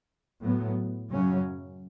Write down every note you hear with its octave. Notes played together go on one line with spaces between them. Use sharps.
A2 F#3 B3
F#2 C#3 F#3 C#4